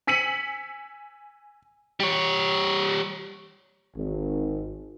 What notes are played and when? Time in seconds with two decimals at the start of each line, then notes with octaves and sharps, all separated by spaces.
0.07 G#5 E6 B6 C#7 D#7 F#7
2.00 G3 C#5
3.96 G#1